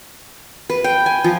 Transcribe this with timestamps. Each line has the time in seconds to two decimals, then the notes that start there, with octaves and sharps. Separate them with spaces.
0.70 B4
0.84 G5
1.06 G#5
1.24 F3